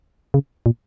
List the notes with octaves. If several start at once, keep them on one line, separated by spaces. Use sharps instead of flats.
C#3
A#2